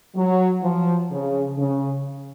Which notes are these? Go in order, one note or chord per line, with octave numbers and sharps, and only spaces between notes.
F#3
F3
C#3
C#3